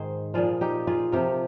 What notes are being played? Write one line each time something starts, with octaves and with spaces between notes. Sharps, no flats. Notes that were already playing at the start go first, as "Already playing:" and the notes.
Already playing: G#2 D#3 G#4 C5
A#2 F3 F4 G#4
D#4 G4
F4 G#4
C3 F3 G4 A#4